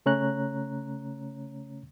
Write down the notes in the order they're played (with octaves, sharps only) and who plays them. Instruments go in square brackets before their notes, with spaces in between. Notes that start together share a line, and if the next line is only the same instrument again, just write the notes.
[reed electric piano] C#3 A3 C#4 C#5 A#5 F#6